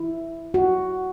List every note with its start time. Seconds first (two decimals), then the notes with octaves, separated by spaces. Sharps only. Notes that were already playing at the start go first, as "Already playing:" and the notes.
Already playing: E4
0.54 F#4